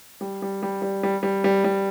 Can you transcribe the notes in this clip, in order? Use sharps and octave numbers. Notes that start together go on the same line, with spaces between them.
G3
G3
G3
G3
G3
G3
G3
G3